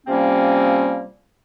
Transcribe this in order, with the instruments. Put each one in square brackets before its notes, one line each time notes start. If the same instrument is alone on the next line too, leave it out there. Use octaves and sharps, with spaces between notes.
[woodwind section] C3 F3 G3 A#3 C4 C#4